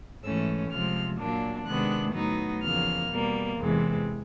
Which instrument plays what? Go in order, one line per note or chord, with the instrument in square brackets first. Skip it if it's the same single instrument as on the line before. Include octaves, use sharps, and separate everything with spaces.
[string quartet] G#2 E3 A3 C#4 E6
C3 F3 G#3 F6
A#2 F#3 A#3 D4
C3 D#3 G#3 B3 D4 F#6
A2 F#3 B3 D#4
E2 C#3 F3 A#3 F6
B2 G3 A#3
E2 C3 E3 G#3